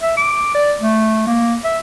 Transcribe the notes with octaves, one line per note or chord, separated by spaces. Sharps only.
E5
D6
D5
A3
A#3
E5